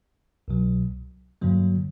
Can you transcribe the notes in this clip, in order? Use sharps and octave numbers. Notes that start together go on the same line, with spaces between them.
C2 B2 F#3
G2 D3 F#3 A#3